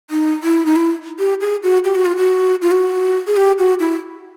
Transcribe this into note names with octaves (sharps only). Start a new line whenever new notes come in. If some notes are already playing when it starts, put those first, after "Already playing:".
D#4
E4
D#4
E4
G4
G#4
F#4
G4
F#4
F4
F#4
F4
F#4
G#4
G4
F#4
E4